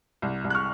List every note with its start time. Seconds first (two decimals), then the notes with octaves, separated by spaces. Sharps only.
0.22 C2
0.44 C2
0.50 F#6
0.55 C#6 F6